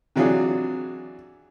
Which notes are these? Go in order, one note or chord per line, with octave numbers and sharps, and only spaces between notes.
C3 E3 F#3 D4 F4 G#4